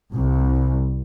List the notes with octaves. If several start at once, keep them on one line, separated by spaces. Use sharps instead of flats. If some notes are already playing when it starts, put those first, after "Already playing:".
C2